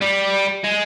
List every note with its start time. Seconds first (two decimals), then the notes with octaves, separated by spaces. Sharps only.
0.01 G3
0.64 G#3